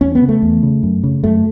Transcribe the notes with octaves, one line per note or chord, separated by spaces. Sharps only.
E2 C#4
B3
C#3
A3
E2
C#3
F#2
C#3
F#2 A3